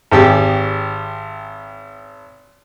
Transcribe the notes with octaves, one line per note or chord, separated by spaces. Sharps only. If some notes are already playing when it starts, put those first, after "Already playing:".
G#1 G4 G#4